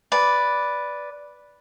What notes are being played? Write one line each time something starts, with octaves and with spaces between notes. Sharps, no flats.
B4 D5